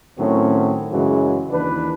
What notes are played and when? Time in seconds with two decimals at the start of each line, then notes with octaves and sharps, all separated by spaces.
0.18 A2 D#3 F#3 C4 C#4
0.92 F#2 C#3 E3 F#3 G#3
1.52 D#2 E3 D4 B4